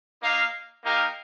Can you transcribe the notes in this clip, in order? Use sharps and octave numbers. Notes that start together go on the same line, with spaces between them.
A#3 D#4 A#4 F5
A#3 D#4 G4 A#4 F5